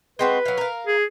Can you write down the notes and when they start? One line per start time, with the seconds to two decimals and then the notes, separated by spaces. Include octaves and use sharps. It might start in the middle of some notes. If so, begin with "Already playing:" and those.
0.19 G#3 C4 F#4 B4
0.45 F#3 F5
0.58 A#4 F5
0.87 G#4